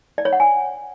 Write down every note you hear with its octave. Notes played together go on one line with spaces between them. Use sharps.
D5
C#5
F#5
G#5